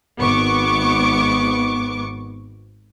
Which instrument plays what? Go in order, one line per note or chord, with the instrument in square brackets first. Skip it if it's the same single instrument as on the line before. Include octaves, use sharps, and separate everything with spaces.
[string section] G#1 B3 C#6 D6